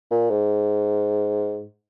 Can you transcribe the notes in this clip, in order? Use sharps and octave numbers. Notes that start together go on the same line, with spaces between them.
A#2
G#2